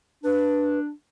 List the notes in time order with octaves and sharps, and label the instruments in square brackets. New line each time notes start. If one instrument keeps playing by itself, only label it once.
[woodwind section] D4 [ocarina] B4